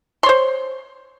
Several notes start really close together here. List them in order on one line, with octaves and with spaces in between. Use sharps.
C6 C#5 C5